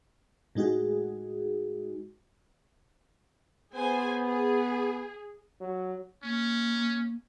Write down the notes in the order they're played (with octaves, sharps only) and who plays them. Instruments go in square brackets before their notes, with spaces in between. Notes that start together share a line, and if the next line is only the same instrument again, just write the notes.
[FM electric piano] A2 G#3 D#4 F#4 G#4
[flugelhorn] B3 [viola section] G#4 C5 G#5
[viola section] G#4
[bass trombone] F#3
[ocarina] A#3 [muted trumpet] C#4